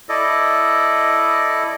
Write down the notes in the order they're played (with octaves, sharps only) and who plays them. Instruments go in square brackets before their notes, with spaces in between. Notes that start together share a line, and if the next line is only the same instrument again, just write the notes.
[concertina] E4 A4 D5 D#5